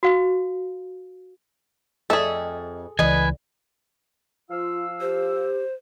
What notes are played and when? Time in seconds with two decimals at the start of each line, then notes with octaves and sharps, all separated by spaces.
0.03 F#4 F5
2.10 F2 G#4 A4 D#5 E5
2.99 C#2 E3 B4 D#5 G#5
4.50 F3 F4 F5 E6
5.01 G4 C5